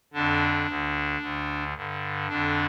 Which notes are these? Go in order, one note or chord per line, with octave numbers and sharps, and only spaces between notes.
F2 D3 D4
D2 D3
D2 D3
G2 D3
F2 D3 D4